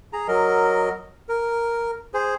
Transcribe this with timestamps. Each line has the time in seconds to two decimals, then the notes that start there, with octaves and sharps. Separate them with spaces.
0.13 G#4 A#5
0.28 F#3 A#4 D#5
1.29 A#4
2.14 G#4 C5